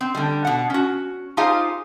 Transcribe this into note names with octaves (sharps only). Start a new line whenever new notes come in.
C4
D3 G3
B2 F#5
C#4 F#4
D#4 F4 G4 G#4 C5 F5